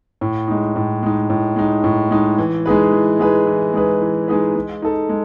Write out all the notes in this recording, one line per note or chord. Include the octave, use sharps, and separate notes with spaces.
A2
G#3 D#4
A2
G#3 D#4
A2
G#3 D#4
A2
G#3 D#4
E3
G#3 D#4 G#4 B4
E3
G#3 D#4 G#4 B4
E3
G#3 D#4 G#4 B4
E3
G#3 D#4 G#4 B4
G#3
D#4 A4
G#3